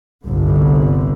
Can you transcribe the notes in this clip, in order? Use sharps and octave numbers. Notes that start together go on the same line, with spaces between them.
G1 C2 D3